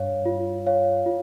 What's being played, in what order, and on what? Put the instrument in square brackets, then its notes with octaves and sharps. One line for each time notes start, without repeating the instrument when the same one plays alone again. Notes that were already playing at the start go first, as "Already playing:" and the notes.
Already playing: [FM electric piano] G2 [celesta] C#5 F5
[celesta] F4
C#5 F5
F4